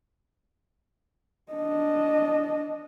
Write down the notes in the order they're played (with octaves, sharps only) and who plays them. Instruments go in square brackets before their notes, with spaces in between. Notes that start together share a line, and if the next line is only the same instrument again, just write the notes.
[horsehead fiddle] D4 D#5